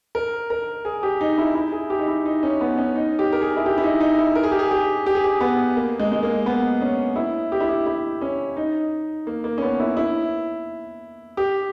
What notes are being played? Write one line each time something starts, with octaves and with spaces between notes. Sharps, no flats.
A#4
A#4
G#4
G4
D#4
E4
E4
G#4
G4
D#4
E4
D#4
C#4
B3
C#4
D#4
G4
A#4
G#4
E4
G4
E4
D#4
D#4
E4
A#4
G#4
G4
G#4
G4
G4
G#4
G4
B3
A#3
G#3
G#3
A#3
B3
C#4
E4
G4
E4
G4
E4
C#4
D#4
A#3
A#3
C#4
B3
E4
E4
G4